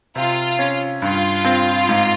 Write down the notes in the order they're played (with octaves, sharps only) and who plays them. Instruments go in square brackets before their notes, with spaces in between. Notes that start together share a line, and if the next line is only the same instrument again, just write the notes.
[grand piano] C3 [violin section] F4
[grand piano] C#4
[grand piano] G2 [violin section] F4
[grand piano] C4
G#2